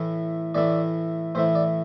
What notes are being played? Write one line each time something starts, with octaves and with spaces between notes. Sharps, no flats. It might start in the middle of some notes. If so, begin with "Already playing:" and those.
Already playing: A2 E3 A3 E4
A2 E3 A3 E4 D5
A2 E3 A3 E4 C5
D5